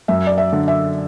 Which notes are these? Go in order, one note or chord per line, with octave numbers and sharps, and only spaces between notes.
F#2 E5
D5
E5
D3
E5